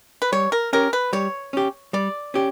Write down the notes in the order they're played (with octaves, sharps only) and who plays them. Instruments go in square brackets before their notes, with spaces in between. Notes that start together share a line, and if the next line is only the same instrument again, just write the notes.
[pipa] B4
[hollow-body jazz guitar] G3 [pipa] C#5
[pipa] A#4
[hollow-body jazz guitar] C#4 G4 [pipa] A#4
[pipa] B4
[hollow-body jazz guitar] G3 [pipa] C#5
[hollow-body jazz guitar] C#4 G4
[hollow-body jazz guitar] G3 [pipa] D5
[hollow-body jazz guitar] C#4 G4